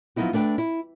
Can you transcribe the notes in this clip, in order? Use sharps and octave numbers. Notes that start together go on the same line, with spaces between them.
F3 F#3 B3 D#4 E4 F#4
A3 D4 B4 G5
E4